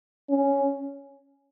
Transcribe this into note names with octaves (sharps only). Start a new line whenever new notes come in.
C#4